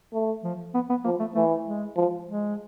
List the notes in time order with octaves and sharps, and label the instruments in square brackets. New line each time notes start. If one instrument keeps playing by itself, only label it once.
[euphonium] A3
[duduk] F3
B3
B3
[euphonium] F3 [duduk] A#3
[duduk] A3
[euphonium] E3 [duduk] A3
[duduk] G#3
[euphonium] F3
[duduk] G#3